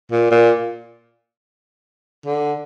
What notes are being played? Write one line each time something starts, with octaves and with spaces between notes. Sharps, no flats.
A#2
A#2
D3